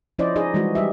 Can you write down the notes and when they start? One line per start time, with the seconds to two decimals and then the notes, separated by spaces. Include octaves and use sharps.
0.19 F3 C#4 E4 C5 D5 D#5
0.36 D#4 G#4 D#5
0.54 E3 G3 G#3 D#4 F#4
0.75 G3 G4 E5